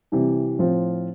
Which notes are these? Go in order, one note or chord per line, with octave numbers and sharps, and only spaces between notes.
C3 E3 G3
A2 F3 C4 F4